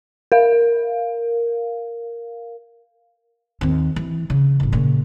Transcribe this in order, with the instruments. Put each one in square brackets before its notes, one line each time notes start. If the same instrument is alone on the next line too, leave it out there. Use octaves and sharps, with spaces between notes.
[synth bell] A#4 F5
[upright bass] D#2 C4
E3
C#3
A1 E2
A#2 C#3